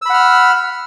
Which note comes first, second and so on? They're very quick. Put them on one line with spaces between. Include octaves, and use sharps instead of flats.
E6 B5 F#5 F6